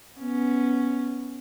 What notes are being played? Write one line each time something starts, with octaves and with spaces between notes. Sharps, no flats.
B3 C#4